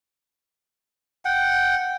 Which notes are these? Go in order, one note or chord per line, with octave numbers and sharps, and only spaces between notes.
F#5 G5